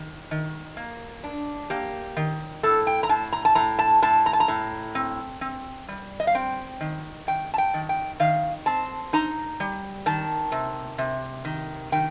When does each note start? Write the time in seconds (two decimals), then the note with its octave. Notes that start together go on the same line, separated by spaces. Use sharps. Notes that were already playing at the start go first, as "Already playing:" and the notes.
Already playing: D#3
0.31 D#3
0.77 A#3
1.24 D4
1.70 A#3 G4
2.17 D#3
2.63 A2 A4
2.87 G5
3.03 A#5
3.09 A2 A5
3.33 A#5
3.45 A5
3.55 A2 A#5
3.79 A5
4.02 A2 A5
4.26 A#5
4.33 A5
4.40 A#5
4.48 A2
4.95 C4
5.41 C4
5.88 G3
6.20 D#5
6.27 F5
6.35 C4 G5
6.81 D#3
7.27 D#3 G5
7.54 A5
7.58 G5
7.74 D#3
7.89 G5
8.20 D#3 F5
8.66 C4 A5
9.13 D#4 A#5
9.60 G3
10.06 D#3 A5
10.52 C3
10.98 C3
11.45 D#3
11.92 D#3 G5